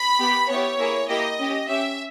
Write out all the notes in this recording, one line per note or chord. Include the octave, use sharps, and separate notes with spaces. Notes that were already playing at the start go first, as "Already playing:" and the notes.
Already playing: B5
B3 G4
B3 E4 G4 C#5
A#3 E4 G#4
A#3 E4 G4 D#5
C#4 G4
C#4 G4 E5